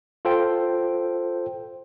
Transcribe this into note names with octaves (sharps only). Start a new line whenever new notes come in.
F4 A4 C5 G5